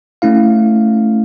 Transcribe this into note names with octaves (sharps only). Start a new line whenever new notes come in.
A3 C#4 E4 F5